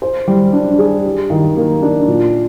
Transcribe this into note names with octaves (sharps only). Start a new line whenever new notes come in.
C5
G3
D4
G#4
G4
D#3
A#3
D4
A#2